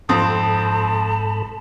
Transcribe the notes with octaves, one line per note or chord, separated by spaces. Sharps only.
F2 G#2 C4 A4 A5 B5 D#6